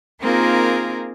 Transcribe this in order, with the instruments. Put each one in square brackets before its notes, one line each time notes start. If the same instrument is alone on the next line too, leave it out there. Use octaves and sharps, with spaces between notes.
[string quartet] A#3 C4 D#4 F4 G#4 A#4